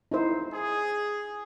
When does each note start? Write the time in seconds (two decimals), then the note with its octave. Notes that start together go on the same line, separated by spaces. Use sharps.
0.11 D#4 E4 C5
0.51 G#4